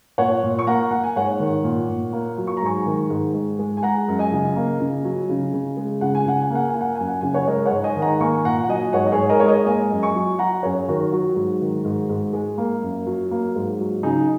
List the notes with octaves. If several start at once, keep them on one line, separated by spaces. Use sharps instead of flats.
A#2 C#5 F#5
A#2
C#6
A#3 F#5 A#5
A#3 F#5
G#5
G#2 C#5 F#5
D#3
A#2
A#2
A#3
F#3
C#6
A#5
G#2 G#5 C#6
D#3
G#2
G#2
G#3
G#5
G#3 F#5 A#5
F#2
D#5 G#5
C#3
A#3
C#3
F#3
C#3
C#3
G#3
C#3 F#5
G#5
C#3 F#5
G#5
A#3 F#5
G#5
A#3
F#5
F#2 G#5
F#5
C#3 G#5
C#5 F#5
G#3 A#4 D#5
C#5 F#5
G#2
D#5 G#5
D#3
F#5 A#5
A#3 G#5 C#6
A#2 F#5 A#5
F#5
F#3 D#5 G#5
G#2 C#5 F#5
D#5
G#4 C#5
G#2
A#4 D#5
C#5
G#3
A#4 D#5
A#3 D#5 G#5
F#2
G#5 C#6
F#3
F#3 F#5 A#5
F#2 G#4 C#5
D#3 F#4 A#4
F#3 F#4
G#2
D#3
G#2
G#2
G#3
A#3
F#2
F#3
A#3
G#2
F#3
C#3 D#4 G#4